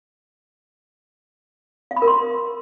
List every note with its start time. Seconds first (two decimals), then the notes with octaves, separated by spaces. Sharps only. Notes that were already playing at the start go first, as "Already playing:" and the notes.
1.91 F5
1.96 B5
2.02 A#4
2.07 C6